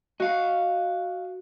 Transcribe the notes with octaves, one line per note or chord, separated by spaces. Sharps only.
F#4 D#5 F5